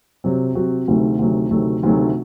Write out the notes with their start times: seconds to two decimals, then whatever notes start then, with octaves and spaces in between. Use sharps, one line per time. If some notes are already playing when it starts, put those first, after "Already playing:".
0.24 C3 F#3 C4 F#4
0.55 C3 F#3 C4 F#4
0.88 D2 C3 D#3 F#3 A3
1.19 D2 C3 D#3 F#3 A3
1.50 D2 C3 D#3 F#3 A3
1.83 D2 C3 D#3 F#3 A3